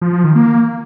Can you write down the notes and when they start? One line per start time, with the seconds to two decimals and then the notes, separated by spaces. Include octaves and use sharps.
0.02 F3
0.13 F3
0.24 D#3
0.35 A#3